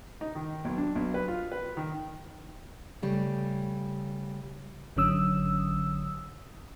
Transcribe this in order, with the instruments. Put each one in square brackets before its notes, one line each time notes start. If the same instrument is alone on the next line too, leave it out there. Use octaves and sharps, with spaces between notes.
[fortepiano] D#4
D#3
B1
D4
B1
B4
F4
B4
D#3
[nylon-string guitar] C#3 G3 A3
[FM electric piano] G#1 D3 F#3 C#4 D#6 E6